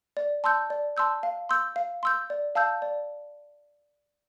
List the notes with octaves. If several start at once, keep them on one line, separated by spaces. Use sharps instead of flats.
D5
A5 C6 E6 G6
D5
A5 C6 E6 G6
F5
C6 E6 G6
F5
C6 E6 G6
D5
F5 A5 E6 G6
D5